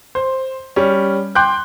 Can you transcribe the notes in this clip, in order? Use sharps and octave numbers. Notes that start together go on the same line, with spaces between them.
C5
G3 C#4
G5 C6 D6 F#6 G6